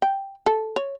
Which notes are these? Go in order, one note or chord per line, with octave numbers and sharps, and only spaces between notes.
G5
A4
C#5